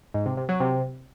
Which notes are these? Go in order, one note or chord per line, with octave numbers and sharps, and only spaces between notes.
G#2
C3
C3
F#3
C3